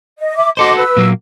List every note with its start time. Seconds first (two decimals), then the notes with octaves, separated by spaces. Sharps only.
0.19 D#5
0.36 E5 D6
0.57 F#4 A4 C5 D#5 C6 D6
0.77 B4 E6
0.97 A#2 F#3 A#3